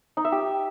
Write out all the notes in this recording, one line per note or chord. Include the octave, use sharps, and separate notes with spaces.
D#4
E5
G4